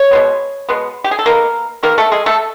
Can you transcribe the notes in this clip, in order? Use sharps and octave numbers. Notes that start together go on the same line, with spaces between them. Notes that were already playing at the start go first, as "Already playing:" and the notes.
Already playing: C#5
B2 G#3 B3
B2 G#3 B3
G4
G#4
A4
D#3 G#3 A#3 B3 A#4
D#3 G#3 A#3 B3 A#4
A3 A4
G#3 G#4
A3 A4